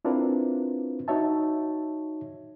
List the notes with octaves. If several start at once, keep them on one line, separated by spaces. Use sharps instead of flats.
C4 D4 E4 F4 A#4 B4
D#4 F#4 C#5 E5 A5